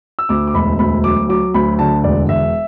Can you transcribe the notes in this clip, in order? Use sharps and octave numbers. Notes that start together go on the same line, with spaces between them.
E6
D2 D6
D6
E1 B5
D2 B5
F#3 D6
F#3 D6
D2 B5
D3 A5
E1 D5
E1 E5